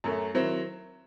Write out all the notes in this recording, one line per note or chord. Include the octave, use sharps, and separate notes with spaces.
F#2 F#3 A3
D#3 F#3 C4 E4